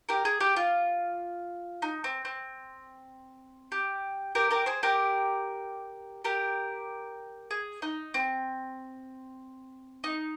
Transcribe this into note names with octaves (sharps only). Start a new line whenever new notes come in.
G4 A#4
G#4
G4
F4
D#4
C4
C4
G4
G4 A#4
G4 A#4
G#4 C5
G4 A#4
G4 A#4
G#4
D#4
C4
D#4